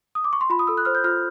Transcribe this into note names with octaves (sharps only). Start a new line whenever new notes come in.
D#6
D6
C#6
C6
F4 B5
D#6
A4 E6
F#6
C5 F6
G6
F4 F6